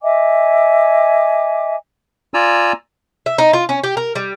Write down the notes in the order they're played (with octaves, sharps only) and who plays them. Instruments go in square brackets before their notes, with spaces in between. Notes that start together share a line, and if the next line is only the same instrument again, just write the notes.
[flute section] D#5 E5 G#5 D6
[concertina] F4 D5 G#5 A#5 E6
[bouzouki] E5
D#4
F4
C#4
G4
A#4
G3